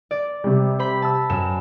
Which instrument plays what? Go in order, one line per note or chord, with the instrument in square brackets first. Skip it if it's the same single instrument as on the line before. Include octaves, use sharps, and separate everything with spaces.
[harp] D5
[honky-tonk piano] C3 G3
[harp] C5 B5 B6
A5 E6
[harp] F#2 [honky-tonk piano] E7